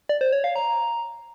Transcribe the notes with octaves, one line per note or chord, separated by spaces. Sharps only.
D5
C5
C#5
F5
A#5